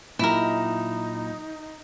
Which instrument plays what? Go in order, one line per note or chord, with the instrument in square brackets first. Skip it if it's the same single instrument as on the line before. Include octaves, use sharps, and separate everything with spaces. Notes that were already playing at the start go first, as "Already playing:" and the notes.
[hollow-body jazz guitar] A#2 F#3 G4 [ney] D#4 [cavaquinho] E4 A#4